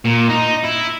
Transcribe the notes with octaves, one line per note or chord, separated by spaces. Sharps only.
A#2
D#4
E4